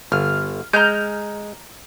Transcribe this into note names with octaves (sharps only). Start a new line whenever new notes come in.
G1 F6
G#3 A#5 F6 G6